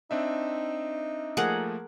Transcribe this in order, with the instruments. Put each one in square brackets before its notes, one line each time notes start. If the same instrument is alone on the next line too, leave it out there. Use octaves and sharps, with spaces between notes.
[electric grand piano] C4 D4 E5 [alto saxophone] D#4
[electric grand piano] F3 A3 A#3 [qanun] G#4 A#4 F#5